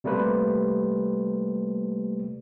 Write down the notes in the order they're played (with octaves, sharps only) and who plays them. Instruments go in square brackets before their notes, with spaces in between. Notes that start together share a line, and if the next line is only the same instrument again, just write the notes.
[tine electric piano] C3 G3 A3 A#3 B4 C5